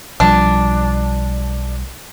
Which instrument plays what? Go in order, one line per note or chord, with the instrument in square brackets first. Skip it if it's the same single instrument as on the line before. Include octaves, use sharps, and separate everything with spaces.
[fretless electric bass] B1 F3 G3 [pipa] D4